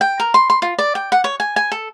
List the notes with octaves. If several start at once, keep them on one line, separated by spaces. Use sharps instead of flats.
G5
A#4
C6
C6
F4
D5
G5
F#5
C#5
G#5
G#5
A4